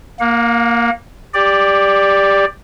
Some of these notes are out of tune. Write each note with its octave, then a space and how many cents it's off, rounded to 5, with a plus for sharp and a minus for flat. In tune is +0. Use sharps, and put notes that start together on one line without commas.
A#3 +0 F5 +45
G4 +20 D5 +0